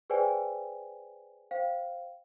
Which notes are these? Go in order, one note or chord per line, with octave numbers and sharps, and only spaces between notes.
G#4 B4 C5 D5 G5 G#5
C5 F5 G5